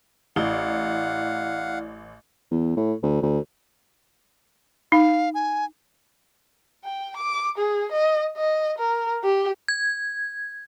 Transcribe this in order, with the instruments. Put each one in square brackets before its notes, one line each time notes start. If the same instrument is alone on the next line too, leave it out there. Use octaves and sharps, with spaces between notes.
[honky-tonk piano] A1 [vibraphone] E4 D5 [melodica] F5 F#5
[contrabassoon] E2
A2
D2
D2
[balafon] D#4 [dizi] F5
[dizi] G#5
[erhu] G5
D6
G#4
D#5
D#5
A#4
G4
[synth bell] G#6